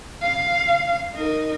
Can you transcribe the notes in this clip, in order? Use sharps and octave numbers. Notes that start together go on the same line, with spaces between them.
F5
D#4 A#4